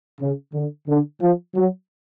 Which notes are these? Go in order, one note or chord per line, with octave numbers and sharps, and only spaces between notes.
C#3
D3
D3
F3
F#3